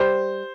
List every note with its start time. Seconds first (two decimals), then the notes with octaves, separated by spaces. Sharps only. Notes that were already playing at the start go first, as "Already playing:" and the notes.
Already playing: G3 C5